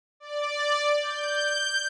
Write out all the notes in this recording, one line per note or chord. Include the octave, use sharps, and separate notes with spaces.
D5
G6